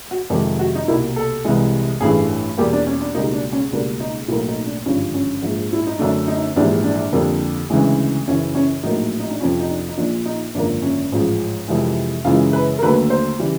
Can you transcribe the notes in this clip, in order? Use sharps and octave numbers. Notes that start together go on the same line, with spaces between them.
F#4
F2 C3 D#3 G#3 G4
F#4
D#4
C2 B2 G3 A#3 E4
A4
C2 C3 E3 G#3
A1 G2 E3 A3 G#4
E2 B2 G3 A#3 G4
D4
C#4
D4
C#2 B2 G3 A#3 D#4
D4
C#4
C#2 B2 G3 A#3 D4
D#4
B1 A2 F#3 A#3 E4
D#4
D4
G#1 G2 D3 F3 C#4
C#4
A#1 G#2 F3
E4
D#4
F#2 D3 F#3 A3 D4
D#4
A#1 G#2 E3 G3 D4
D4
F2 D3 G3 A#3
D2 C#3 E3 G#3
F#2 C#3 E3 C#4
C#4
A#1 A2 F#3 A#3 D#4
D#4
D4
F2 C3 F3 C#4
D#4
D4
D#4
A#1 A#2 F3 D4
D#4
G#1 F#2 D3 F3 A#3 D4
C#4
A1 G#2 F3
F2 C3 E3 G#3
F#2 C#3 E3 G#3 F4
B4
A#4
D#2 D3 F#3 A3 B4
C5
C#3 E3 G3